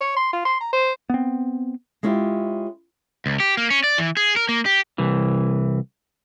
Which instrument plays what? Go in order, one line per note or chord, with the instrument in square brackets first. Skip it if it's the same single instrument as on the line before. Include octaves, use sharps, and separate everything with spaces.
[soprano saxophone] C#5
C6
F4
C6
A#5
C5
[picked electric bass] B3 C4
[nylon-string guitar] G#3 C#4 E4 F4 G4
[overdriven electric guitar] C#2
G4
A#3
C#4
D5
E3
G#4
A#4
A#3
G4
[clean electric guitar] C2 E3